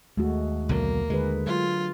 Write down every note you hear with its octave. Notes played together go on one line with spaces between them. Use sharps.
D#2 G#3 A3 F#4
B1 D3 F#3 A#3
D3 G#3 G#4 B4
F#3 F4